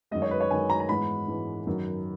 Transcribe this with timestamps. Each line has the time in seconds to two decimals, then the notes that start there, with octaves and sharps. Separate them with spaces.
0.11 F#2 D#3 G#3 D#5
0.22 C#5
0.31 B4
0.41 C#5
0.51 F#2 D#3 G#3 G#5
0.70 A#5
0.80 A#5
0.89 G#2 E3 G#3 B3 B5
1.28 G#2 E3 G#3 B3
1.66 F#2 D#3 F#3